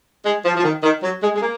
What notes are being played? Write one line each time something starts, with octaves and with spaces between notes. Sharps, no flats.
G#3
F3
F3
D#3
D#3
F#3
G#3
G#3
A#3